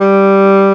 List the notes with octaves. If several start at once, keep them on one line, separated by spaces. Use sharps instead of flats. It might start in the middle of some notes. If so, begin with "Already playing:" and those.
G3